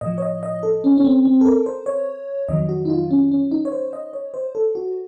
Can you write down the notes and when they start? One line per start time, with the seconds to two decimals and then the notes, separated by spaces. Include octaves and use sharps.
0.01 A2 F3 D#5
0.18 C#5
0.22 D#5
0.43 D#5
0.63 A4
0.84 C#4
0.98 C#4
1.04 C4
1.25 C4
1.41 A4
1.45 A#4
1.66 C5
1.86 C#5
2.48 F2 D#3 F#3 D#5
2.69 F#4
2.85 D#4
2.90 F4
3.11 C#4
3.31 C#4
3.51 D#4
3.65 C#5
3.72 C5
3.93 D#5
4.13 C#5
4.34 C5
4.55 A4
4.75 F#4